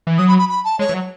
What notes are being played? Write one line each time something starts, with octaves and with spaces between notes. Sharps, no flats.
E3
F#3 D#6
B5
B5
B5
A5
G#3 C#5
E3
F#3